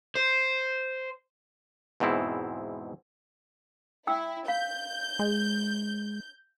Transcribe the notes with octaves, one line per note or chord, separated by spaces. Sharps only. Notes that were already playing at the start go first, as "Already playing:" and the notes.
C5
E2 G#2 B2 C4 E4
E4 G5 E6
F5 G6
G#3